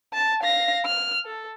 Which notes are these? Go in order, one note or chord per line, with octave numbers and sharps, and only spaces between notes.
A5
F5 A#6
F6
A4